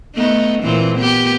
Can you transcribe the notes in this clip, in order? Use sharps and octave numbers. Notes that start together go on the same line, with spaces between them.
A3 B3 D#4
A#2 E3 C4
B3 G4